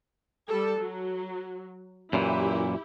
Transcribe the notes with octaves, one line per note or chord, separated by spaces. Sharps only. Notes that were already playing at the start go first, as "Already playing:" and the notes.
G3 A4
F#3
F#2 A#2 E3 E4 G4